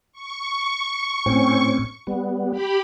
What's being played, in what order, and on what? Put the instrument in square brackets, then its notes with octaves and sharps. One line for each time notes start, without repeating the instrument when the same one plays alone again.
[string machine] C#6
[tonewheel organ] A2 C4 C#4
G3 B3
[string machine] G4 B5